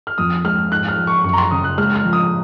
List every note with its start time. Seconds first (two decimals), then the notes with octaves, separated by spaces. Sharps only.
0.07 F6
0.18 F2 D#6
0.45 G#3 F6
0.72 G#2 F#6
0.88 F6
0.98 F3
1.07 C#6
1.24 F#2 C#6
1.33 A#5
1.38 C6
1.51 C#3 D#6
1.64 F#6
1.78 G#3 F6
1.96 F6
2.04 F3
2.13 D#6